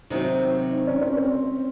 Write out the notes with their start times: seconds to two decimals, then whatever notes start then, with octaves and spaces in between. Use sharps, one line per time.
0.10 C3 D#3 F#3 C4 D#4
0.72 D#4
0.87 C#4
1.01 C4
1.17 C4